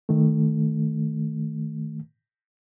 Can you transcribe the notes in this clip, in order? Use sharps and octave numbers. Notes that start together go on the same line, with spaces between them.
D#3 A3